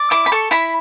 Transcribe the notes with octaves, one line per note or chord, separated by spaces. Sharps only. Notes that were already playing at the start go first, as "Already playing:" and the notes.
Already playing: D5
E4 D6
B5
A4 C#6
E4 B5